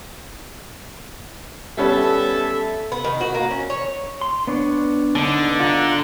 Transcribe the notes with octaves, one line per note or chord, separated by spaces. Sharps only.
G3 B3 C#4 A4 E5
B3
D#3
F#4
A#3
C#4
C#5
C6
B3 D4 C#5
D3 B3 D4 D#4
F4 F#5 A#5